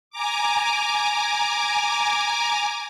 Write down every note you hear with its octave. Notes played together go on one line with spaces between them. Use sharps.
G#5 A#5 D6